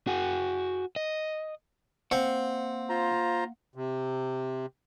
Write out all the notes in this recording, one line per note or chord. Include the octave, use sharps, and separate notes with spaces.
F#4 G#4
D#5
A#3 C4 F5 F#5
F4 C5 A#5
C3